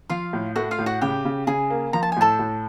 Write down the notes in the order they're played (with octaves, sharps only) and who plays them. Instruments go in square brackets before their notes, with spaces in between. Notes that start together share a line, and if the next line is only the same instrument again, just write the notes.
[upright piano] F3 [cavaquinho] F4 F5
[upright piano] A2
[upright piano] A3 [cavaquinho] F#4 F#5
[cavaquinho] F4 F5
[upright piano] A2
[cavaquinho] F#4 F#5
[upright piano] C#3 [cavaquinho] G4 G5
[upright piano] C#3
[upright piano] C#3 [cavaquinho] G#4 G#5
[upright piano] A#3
[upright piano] F3 [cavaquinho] A#5
[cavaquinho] A5
G#5
[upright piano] A2 [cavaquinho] A4 A5
[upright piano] A2